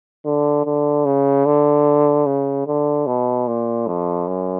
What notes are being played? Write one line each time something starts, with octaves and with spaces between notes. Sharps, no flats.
D3
D3
C#3
D3
C#3
D3
B2
A#2
F2
F#2